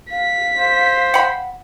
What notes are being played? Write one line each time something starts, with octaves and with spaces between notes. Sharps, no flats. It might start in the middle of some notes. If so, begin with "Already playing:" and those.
F5 B6
C5
F#5 G5 B5